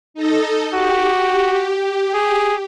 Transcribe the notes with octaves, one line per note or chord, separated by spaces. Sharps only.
D#4 A4 D#5
F#4 G4
G#4